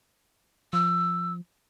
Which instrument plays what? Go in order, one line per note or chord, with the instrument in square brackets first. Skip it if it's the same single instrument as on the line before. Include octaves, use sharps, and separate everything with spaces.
[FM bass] F3 [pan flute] E6